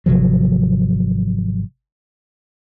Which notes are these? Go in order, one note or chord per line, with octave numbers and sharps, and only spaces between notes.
G#1 C3 F3 F#3